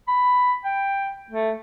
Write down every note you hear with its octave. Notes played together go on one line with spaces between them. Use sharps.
B5
G5
A3